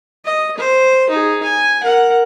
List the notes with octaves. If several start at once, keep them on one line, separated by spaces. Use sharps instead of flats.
D#5
C5
D#4 G#4
G#5
A#4 F#5